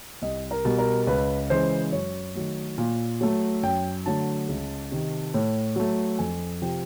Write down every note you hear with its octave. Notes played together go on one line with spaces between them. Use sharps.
C2 D#5
A#4
B2 G3
A#4
C#2 B4
C#3 E3 G#3 C5
F#2 C#5
D#3 F#3 A3
A#2
F#3 A3
F#2 G5
D3 F#3 A3 A5
C#2
C3 D#3
A2
F#3 A3
F2 G#5
C3 F3 G5